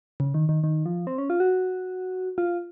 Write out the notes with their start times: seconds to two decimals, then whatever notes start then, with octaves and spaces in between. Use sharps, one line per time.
0.20 C#3
0.34 D#3
0.49 D#3
0.64 D#3
0.86 F3
1.07 C4
1.18 C#4
1.30 F4
1.40 F#4
2.38 F4